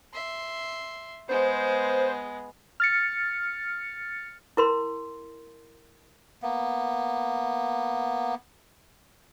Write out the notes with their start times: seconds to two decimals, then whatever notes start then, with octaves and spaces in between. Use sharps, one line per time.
0.14 E5 C6
1.29 G#3 B3 C5
2.80 F6 A6 C#7
4.57 E4 A#4 C6
6.43 A#3 B3